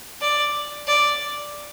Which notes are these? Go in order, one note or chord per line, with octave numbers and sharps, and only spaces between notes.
D5
D5